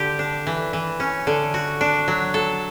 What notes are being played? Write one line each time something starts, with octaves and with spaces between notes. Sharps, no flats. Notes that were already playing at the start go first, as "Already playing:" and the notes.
Already playing: D3 G4
D4
E3
E3
C#4
D3
F#4
D4
F#3
A4